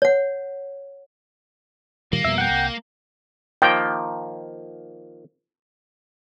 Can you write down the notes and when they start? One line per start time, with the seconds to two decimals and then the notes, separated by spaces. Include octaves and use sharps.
0.02 C#5 F#5
2.13 A#2 D#3 G3 A#3
2.25 F2 B2 G3 E5
2.38 F#5 G5
2.50 C2
3.62 D#3 F3 A#3 G5